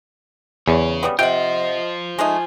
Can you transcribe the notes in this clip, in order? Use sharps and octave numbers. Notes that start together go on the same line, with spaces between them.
E2 G#4 C#5
C#3 G3 B3
C3 F4 C5 D#5 F#5 G5
G#3 A3 D#4 G#5